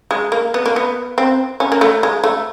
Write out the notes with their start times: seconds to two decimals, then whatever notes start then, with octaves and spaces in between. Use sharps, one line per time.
0.11 G#3
0.32 A#3
0.54 B3
0.66 A#3
0.76 B3
1.18 C4
1.60 C#4
1.72 A#3
1.81 A3
2.03 G#3
2.24 A3